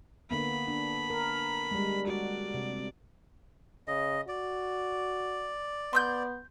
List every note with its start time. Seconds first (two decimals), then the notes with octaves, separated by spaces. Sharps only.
0.31 D3 A#3 B3 B5
0.67 D4
1.10 A#4
1.71 G3 G#3
2.07 F#4 D5
2.54 C3
3.87 C#3 D#5
4.28 F#4 D5
5.93 B3 C6 E6 G6